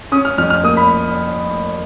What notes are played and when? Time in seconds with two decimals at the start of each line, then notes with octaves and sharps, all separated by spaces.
0.12 C#4 D#6
0.25 F6
0.38 F2 F6
0.50 F6
0.63 A#3 D#6
0.77 B5